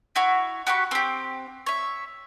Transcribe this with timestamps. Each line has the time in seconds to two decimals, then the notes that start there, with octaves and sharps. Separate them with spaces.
0.16 E4 F#4 C#5
0.67 F#4 G4 B5 C#6
0.91 C4 G4
1.66 C#5 E5